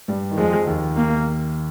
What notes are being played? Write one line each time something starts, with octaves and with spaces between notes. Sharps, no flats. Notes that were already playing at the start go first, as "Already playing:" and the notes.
G2 G3
D#3
F2 F3 G#3
D#2 D#3
A#3